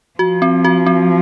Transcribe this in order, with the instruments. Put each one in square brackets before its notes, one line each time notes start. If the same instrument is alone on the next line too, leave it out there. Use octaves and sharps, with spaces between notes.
[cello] F3 [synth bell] F#4
[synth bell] C4
F#4
C4